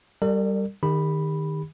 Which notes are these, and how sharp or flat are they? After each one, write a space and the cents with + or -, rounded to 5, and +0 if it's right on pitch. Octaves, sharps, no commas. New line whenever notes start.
G3 +0 A#4 -45 D5 +30
D#3 -15 G4 +35 B5 +0